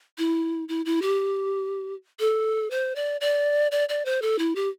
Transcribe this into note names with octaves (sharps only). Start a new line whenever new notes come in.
E4
E4
E4
G4
A4
C5
D5
D5
D5
D5
C5
A4
E4
G4